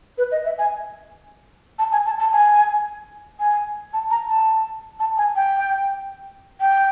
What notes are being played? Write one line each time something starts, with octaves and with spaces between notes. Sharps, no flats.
B4
D#5
E5
G#5
A5
G#5
A5
A5
G#5
G#5
A5
A#5
A5
A5
G#5
G5
G5